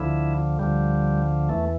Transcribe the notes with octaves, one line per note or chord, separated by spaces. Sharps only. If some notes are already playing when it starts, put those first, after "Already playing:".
Already playing: D2 D3 F3 E4
D2 D3 F3 G3
E2 E3 A3